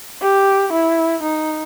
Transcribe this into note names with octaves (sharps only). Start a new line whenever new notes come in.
G4
E4
D#4